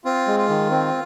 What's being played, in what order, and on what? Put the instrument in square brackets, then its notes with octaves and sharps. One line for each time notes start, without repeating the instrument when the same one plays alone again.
[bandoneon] C4 [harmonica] F4
[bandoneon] G#3
[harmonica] F4
[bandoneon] D#3
C4